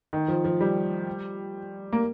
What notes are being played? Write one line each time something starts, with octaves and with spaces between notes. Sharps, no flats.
D#3
F3
F3
G3
A#3